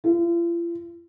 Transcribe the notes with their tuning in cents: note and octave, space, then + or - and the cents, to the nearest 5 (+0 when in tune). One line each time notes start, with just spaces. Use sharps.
F4 -45